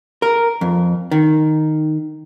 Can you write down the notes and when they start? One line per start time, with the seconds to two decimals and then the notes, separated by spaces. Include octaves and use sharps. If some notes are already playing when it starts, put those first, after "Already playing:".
0.22 A#4
0.61 F2
1.11 D#3